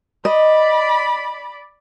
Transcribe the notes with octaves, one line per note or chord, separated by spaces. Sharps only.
D5 D#5 B5